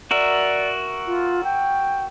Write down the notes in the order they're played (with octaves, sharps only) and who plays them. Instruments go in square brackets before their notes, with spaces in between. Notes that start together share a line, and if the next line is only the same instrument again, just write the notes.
[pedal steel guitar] F#4 A#4 E5 [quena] D5
[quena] F4
G5